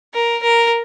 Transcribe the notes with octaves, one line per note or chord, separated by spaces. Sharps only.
A#4
A#4